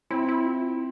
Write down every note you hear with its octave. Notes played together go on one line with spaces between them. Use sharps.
C4 E4
E4
F4
E4